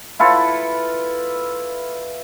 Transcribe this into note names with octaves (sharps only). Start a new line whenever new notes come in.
E4 F4 A4 B4